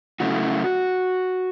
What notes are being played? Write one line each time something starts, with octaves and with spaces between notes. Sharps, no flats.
C#3 F#3 A3 C#4 E4 F#4